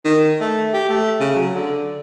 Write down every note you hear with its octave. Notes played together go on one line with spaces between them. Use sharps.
D#3
A3
G4
A3
C#3
F#3
D3